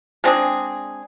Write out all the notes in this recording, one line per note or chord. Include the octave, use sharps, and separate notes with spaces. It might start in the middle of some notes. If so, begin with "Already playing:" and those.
G#3 C4 D4 G#4